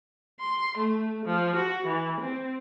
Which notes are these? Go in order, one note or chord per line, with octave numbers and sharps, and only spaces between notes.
C6
A3
F3
F#4
E3
C4